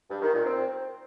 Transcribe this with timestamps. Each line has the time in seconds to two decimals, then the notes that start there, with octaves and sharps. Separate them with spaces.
0.10 G2
0.22 D#3
0.34 A#2
0.46 C4